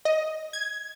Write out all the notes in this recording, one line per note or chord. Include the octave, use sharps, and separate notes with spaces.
D#5
G#6